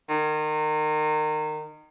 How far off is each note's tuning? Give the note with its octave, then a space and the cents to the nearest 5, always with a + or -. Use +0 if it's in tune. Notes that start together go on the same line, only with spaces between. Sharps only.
D#3 -25